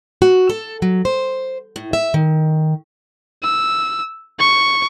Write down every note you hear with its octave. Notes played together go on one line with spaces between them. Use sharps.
F#4
A4
F#3
C5
A2
E5
D#3
E6
C#6